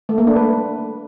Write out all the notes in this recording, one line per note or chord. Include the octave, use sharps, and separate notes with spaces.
A3
A#3
D4
B4